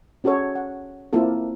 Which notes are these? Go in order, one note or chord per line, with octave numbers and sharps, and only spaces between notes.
C#4 F#4 G#4 A4 C#5
F#5
A#3 C4 E4 F4 A4